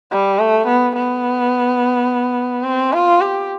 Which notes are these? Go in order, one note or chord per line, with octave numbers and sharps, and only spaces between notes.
G3
A3
B3
B3
C4
F4
G4